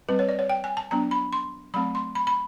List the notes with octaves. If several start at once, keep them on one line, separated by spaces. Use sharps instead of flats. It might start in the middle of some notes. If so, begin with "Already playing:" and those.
G3 C4 B4
C#5
D5
C#5
G5
G#5
A5
F#3 B3 D4 A#5
B5
C6
F#3 A3 C4 B5
C6
B5
B5